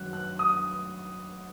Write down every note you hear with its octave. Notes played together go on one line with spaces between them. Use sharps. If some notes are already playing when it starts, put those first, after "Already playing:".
Already playing: F#2 D#3 F#3 F#6
F#6
D#6